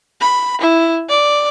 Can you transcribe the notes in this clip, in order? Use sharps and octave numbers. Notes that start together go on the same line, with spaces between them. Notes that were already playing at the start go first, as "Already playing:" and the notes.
B5
E4
D5